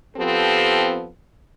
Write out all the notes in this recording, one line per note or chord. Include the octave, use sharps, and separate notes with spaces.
F3 B3 C4 G4 A4